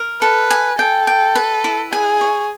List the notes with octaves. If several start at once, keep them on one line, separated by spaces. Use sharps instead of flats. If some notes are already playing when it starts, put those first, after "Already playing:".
Already playing: A#4
A4 B4
G#5
A4 G5
G5
B4
E4
G#4 G#5
C#5